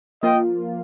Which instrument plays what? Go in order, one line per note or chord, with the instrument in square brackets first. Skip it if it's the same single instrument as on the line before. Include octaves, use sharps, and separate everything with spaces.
[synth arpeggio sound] F3 A#3 F4 [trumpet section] D#5 G5